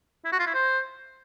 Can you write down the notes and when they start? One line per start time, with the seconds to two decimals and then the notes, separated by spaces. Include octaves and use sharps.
0.25 E4
0.32 F#4
0.39 F4
0.47 E4
0.54 C5